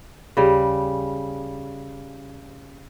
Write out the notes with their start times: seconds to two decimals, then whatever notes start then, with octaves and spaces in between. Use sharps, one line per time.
0.37 D#2 C#3 G3 G4